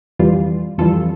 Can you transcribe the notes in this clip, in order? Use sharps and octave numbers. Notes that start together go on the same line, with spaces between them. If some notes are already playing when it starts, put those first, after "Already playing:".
F2 E3 G3 F4
F2 E3 G3 F4 A4